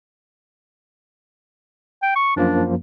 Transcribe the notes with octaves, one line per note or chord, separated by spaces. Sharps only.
G5
C#6
F#2 F3 A#3 D4